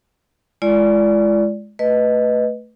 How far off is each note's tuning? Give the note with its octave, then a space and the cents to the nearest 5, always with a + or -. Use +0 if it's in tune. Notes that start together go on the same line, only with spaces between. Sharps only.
G#3 +15 F4 -40 D5 -15
A3 +10 B4 +0 D#5 +0